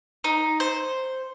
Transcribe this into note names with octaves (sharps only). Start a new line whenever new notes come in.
D#4
C5